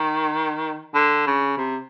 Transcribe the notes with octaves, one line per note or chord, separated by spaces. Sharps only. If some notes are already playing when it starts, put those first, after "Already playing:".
Already playing: D#3
D3
C#3
C3